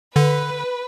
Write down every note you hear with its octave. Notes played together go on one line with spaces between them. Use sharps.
D3 B4